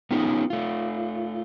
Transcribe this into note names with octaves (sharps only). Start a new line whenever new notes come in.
B3 C#4 D#4 F4 G4
A3 F4